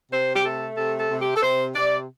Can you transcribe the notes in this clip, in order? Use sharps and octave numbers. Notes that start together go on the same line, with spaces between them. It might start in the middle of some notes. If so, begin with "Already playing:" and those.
C3 C5
G4
A3 A4
C3 A4
A4
C3
G4
A4
C3 C5
C3 D5